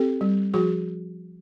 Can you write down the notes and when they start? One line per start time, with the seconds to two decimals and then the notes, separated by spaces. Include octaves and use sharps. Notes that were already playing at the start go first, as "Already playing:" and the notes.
Already playing: C4 G4 A4
0.21 G3
0.54 F3 F#4 G#4